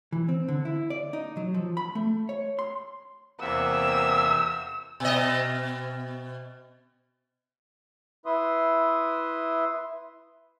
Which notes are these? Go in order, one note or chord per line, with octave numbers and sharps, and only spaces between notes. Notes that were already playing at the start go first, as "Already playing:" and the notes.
E3
C4
D3
E4
D5
D#4
F#3
F3
B5
A3
C#5
C6
E2 C3 A#3 C4 E5 F#5 E6
B2 D#5
E4 B4 E5 C6 D#6